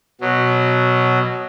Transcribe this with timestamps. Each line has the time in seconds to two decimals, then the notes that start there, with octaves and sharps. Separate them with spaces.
0.21 B2 F#3